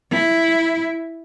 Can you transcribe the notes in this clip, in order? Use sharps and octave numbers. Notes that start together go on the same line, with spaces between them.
E4